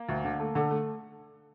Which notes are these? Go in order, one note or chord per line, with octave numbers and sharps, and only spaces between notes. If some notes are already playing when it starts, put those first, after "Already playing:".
Already playing: A#3
D2
D3
A3
D3 A4
A3